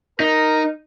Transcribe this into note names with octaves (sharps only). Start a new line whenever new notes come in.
D#4 A#4